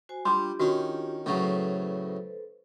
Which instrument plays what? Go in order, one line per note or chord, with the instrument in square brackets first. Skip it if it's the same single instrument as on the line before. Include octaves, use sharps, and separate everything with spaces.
[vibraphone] F#4 C5 G#5
[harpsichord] G3 [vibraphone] D4 F4 G4 [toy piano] C6 D6
[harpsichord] D#3 C#4 [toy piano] F#4
[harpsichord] A2 C#3 F#3 [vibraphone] A4 B4 C5